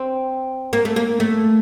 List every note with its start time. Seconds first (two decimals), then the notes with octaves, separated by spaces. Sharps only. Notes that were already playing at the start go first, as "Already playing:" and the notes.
Already playing: C4
0.73 A#3
0.85 A3
0.96 A#3
1.20 A3